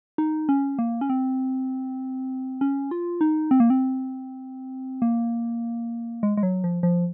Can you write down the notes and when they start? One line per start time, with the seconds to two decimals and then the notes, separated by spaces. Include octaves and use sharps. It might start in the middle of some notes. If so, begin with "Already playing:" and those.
0.18 D#4
0.49 C#4
0.79 A#3
1.01 C#4
1.10 C4
2.61 C#4
2.91 F4
3.21 D#4
3.51 C4
3.60 A#3
3.70 C4
5.02 A#3
6.23 G#3
6.37 G#3
6.43 F#3
6.64 F3
6.83 F3